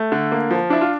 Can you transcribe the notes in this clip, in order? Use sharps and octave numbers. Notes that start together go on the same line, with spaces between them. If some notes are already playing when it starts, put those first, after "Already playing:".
Already playing: A3
D3
A#3
F3
D4 E4
F4